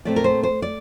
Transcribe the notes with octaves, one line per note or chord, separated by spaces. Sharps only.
A#2 A3 C4 D5
A#4
C5
C5
D5